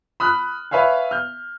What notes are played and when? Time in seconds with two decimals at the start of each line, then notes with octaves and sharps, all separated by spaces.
0.20 B5 D#6 F6 F#6
0.71 B4 C#5 E5 F5 G#5
1.11 F6 G6